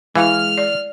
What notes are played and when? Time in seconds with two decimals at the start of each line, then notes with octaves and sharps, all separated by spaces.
0.16 E3 G#3 E4 F5 F6
0.57 D5